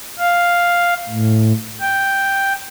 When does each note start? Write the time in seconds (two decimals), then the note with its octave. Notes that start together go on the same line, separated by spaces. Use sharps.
0.18 F5
1.09 A2
1.81 G5